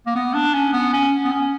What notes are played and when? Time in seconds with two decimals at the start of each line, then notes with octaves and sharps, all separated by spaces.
0.07 A#3
0.15 B3
0.34 D4
0.54 C#4
0.73 B3
0.93 C#4
1.24 B3
1.32 C#4